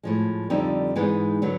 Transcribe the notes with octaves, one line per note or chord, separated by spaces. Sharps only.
A2 F3 G#3
F2 D3 G3 C4 D#4
G#2 E3 G#3 B3 D#4
D3 F#3 B3